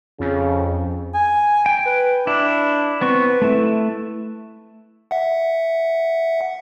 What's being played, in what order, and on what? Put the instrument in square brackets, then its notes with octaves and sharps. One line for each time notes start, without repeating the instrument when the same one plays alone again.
[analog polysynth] F2 [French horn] C#3
[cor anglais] G#5
[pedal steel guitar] G5
[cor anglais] B4
[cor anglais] D4 [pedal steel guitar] E4
[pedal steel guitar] B3 C4 C#6 [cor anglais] B4
[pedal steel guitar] A3 E4
[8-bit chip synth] E5 F#5